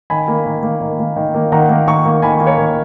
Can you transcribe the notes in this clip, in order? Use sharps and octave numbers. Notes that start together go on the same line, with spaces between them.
D#3 G#5 B5
A#3
D#3
A#3
D#3
A#3
D#3
A#3
D#3 F#5 A#5
A#3
D#3 A#5 C#6
A#3
D#3 G#5 B5
A#3
A#4 C#5
D#3